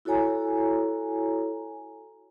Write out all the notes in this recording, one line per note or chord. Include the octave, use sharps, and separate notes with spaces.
E4 F#4 A4 C#5 G#5 A#5